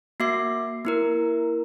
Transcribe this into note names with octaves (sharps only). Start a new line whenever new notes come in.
A#3 F#4 E5 D6 C7
A#3 E4 A#4